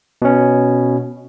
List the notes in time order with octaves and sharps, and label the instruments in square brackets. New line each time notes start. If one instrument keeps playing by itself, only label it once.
[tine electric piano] B2 C#4